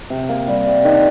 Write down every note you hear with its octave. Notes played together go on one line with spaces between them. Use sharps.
C3
A#3
G3
C3
D#3